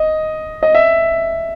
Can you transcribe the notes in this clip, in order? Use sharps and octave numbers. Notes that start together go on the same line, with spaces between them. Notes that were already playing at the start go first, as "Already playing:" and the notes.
Already playing: D#5
D#5
E5